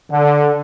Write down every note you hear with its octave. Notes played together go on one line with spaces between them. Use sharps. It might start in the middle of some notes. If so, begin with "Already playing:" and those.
D3